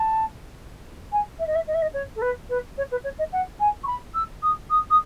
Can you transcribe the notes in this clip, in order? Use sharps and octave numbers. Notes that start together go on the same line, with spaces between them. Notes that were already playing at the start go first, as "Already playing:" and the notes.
Already playing: A5
G#5
E5
D#5
E5
D#5
E5
D#5
C#5
A4
B4
B4
C#5
B4
C#5
D#5
F#5
G#5
C#6
B5
E6
D#6
D#6
D#6